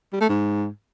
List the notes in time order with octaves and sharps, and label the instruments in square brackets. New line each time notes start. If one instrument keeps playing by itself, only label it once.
[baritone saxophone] G3
A3
G#2